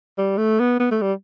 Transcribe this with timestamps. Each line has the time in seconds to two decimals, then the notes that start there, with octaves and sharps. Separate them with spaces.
0.18 G3
0.38 A3
0.60 B3
0.80 B3
0.91 A3
1.02 G3